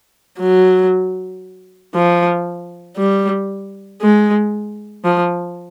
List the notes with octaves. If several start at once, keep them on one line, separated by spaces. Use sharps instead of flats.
F#3
F3
G3
G#3
F3